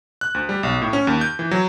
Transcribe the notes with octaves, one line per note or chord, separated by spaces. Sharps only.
F#6
D2
G3
B1
A2
C#4
D#2
G6
E3
F#3